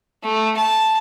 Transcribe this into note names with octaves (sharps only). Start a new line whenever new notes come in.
A3
A5